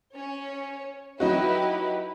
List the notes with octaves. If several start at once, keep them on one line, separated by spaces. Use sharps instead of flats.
C#4 C#5
F#3 D#4 E4 F#4 G4 B4